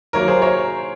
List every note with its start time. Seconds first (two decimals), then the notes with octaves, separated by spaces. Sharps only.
0.13 D#3 F#3 A#3 A#4 C#5
0.27 G#4 C5
0.42 A#4 C#5